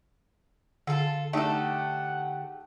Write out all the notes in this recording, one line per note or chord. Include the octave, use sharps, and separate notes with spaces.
D3 F4 A4
A3 D4 D#4 G4 A4 F#5